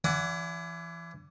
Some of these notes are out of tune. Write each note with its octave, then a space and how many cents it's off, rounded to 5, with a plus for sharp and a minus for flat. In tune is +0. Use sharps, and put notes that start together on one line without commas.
E3 +30 D5 -30 F#5 +0